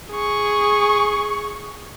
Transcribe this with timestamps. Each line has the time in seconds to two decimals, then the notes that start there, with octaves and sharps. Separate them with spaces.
0.12 G#4 C#6